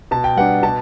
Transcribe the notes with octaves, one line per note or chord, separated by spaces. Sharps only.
B2 A5
G5
G3 B3 D4 F#5
B2 A5